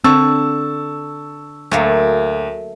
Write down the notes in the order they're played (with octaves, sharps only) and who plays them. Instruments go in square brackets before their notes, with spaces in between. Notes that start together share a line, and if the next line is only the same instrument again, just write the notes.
[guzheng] D3 [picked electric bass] C4 [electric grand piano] A5 C#6 [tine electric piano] E6
[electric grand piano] D2 [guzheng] F#3 A3 A#3